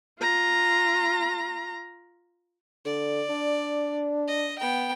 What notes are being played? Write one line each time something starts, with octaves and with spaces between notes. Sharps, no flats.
F4 A#5
D3 D5
D4
D#5
B3 G5